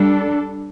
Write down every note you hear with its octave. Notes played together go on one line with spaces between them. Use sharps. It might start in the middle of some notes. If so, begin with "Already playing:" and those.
Already playing: G3 D4 A4